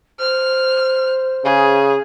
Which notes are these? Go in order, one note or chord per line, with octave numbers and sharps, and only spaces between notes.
C5 F6
C#3 G#4